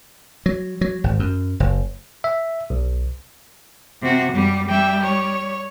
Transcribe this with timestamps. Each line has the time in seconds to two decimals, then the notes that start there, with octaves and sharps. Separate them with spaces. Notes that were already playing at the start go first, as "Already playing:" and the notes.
0.46 F#3
0.81 F#3
1.04 G#1
1.19 F#2
1.60 F#1
2.24 E5
2.70 B1
4.02 C3 F#4
4.32 F#2 G3
4.69 G3 E5 G5
5.03 C#5